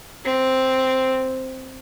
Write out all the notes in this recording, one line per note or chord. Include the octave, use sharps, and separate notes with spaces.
C4